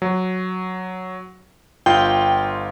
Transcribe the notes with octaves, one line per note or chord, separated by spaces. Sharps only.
F#3
G1 F4 G5 G6